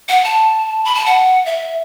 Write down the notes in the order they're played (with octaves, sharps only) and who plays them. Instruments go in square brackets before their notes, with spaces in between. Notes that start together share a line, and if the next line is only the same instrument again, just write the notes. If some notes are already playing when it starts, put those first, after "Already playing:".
[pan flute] F#5
A5
B5
A5
F#5
E5